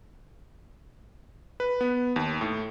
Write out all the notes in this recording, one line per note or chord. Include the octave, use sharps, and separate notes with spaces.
B4
B3
D#2
A2